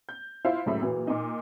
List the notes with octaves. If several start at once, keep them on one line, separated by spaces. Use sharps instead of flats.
G6
E4 F4 C5 E5 F5
C#2 F#2 A2 E5
A#2 E3 F#3
A#2 D#4